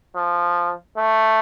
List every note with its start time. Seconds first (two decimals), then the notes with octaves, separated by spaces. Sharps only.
0.16 F3
0.97 A3